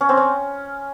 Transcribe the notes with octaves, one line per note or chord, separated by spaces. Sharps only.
C#4
C4
C#4